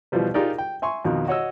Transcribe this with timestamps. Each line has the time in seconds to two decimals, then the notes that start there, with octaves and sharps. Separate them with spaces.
0.12 B2 E3 F3 G3 B4
0.34 D#4 F4 G4 G#4 A#4 D5
0.58 G5
0.82 E5 G#5 C6 C#6
1.05 F2 B2 D#3
1.28 F#4 C#5 D#5 E6